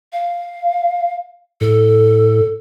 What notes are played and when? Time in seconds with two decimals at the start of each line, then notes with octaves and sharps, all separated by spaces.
0.13 F5
1.61 A2 A4